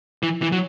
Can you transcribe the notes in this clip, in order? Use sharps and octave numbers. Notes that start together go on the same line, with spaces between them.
E3
E3
F#3